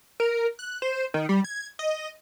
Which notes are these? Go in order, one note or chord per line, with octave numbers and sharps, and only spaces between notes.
A#4
F#6
C5
D#3
G3
G#6
D#5